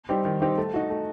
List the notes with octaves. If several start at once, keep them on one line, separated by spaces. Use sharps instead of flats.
G3 C4 D#4 G4
D#3
G3 C4 D#4 G4
A3
D#4 F#4
A3